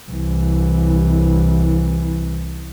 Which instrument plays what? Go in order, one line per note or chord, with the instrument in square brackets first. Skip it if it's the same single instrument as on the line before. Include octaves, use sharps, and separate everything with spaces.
[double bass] C2 E3